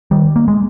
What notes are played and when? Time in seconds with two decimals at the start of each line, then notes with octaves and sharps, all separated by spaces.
0.11 D#3 G3
0.36 A#3
0.48 G#3